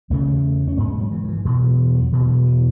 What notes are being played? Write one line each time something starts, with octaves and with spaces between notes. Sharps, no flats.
E2 C#3 A3
A3
C#4
G#2 B3
G#3
F#3
E3
D#3
E3
E2 B2 E3
F#3
F#3
E2 B2 E3
F#3
E3